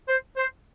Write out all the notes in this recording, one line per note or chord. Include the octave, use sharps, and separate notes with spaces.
C5
C5